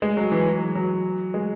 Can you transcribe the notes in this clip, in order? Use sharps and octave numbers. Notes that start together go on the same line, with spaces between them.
G#3
F#3
E3
F#3
F#3
G#3